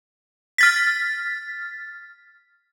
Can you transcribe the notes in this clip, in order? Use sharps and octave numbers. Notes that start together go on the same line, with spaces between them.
F6 A6 B6